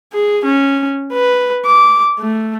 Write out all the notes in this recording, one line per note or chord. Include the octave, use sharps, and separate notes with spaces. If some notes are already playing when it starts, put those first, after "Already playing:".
G#4
C#4
B4
D6
A3